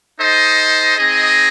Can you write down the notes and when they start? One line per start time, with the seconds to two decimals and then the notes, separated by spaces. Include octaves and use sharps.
0.18 D#4 A4 C5 D#5
0.97 C4 D#4 G#4 D#5